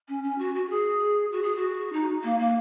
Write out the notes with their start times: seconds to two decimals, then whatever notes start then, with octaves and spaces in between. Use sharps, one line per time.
0.08 C#4
0.23 C#4
0.38 F#4
0.55 F#4
0.70 G#4
1.32 F#4
1.43 G#4
1.56 F#4
1.93 D#4
2.23 A#3
2.39 A#3